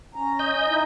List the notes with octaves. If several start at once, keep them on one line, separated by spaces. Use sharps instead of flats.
C#4 A#5
D#5 G6
D#4 E4